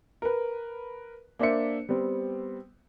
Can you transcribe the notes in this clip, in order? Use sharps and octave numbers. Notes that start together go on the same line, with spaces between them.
A#4 B4
A#3 D4 C5 E5 C#7
G3 B3 C4